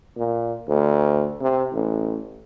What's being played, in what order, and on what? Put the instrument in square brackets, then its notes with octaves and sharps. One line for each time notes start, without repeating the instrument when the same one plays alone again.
[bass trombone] A#2
D2
C3
A1